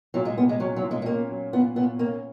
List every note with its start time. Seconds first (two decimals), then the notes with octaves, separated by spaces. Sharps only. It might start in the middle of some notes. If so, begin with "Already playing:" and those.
0.14 A#2 F#3
0.25 G#3
0.37 A#2 B3
0.49 G#3
0.60 F#3 C#4
0.76 F#3
0.83 A#2
0.91 G#3
1.02 G#3
1.06 A#3 C#4
1.30 F#3
1.53 A#2 B3
1.76 A#2 B3
1.98 A#3 C#4